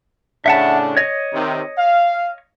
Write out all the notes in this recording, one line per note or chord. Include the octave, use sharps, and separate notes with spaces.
A2 C#3 D4 E5 F#5 A5
C#5 D#5
C3 D#3
F5